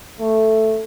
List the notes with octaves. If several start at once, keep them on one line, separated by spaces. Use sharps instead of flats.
A3